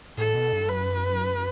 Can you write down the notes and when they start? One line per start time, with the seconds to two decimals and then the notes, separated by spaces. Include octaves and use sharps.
0.18 A2 A4
0.35 B2
0.53 G2
0.69 F#2 B4